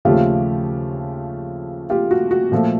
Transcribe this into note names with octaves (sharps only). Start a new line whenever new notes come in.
D#2 C#3 F3 A3 F4 G4
F4 G4
F#4
F#4
A#2 F3 A3